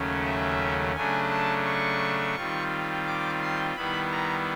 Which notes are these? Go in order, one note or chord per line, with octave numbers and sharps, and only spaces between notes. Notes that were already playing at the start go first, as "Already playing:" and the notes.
Already playing: D#2 C#3 F#3 A3 C#4
E5
C#3 F#3 A3 D4 G#5
A5
C#6
D#3 G3 C4 F4
D6
C6
D#3 G3 B3 E4 B5
A#5